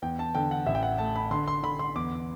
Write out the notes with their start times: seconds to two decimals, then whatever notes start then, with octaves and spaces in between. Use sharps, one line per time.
0.02 E2 G5
0.19 A5
0.35 D3 G5
0.51 F#5
0.66 A1 E5
0.75 G5
0.83 F#5
0.98 A3 A5
1.16 B5
1.31 D3 C6
1.48 C6
1.63 D3 B5
1.79 C6
1.95 E2 D6